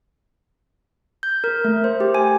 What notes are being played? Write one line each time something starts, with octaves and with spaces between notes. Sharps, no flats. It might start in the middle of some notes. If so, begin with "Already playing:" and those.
G6
A#4
A3
C5
G4
G#5